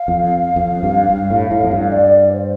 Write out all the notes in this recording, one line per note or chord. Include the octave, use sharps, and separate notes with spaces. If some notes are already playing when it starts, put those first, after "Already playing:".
Already playing: F5
F2
F2
G2
G2
A2
A2
F2
G2
D5
C5